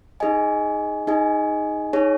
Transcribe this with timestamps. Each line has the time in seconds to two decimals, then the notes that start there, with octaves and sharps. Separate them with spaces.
0.20 D#4 G#4 D#5 G#5
1.07 D#4 G#4 D#5 G#5
1.93 D#4 G#4 C#5